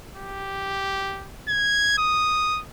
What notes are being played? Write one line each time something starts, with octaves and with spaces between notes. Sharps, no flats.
G4
G#6
D#6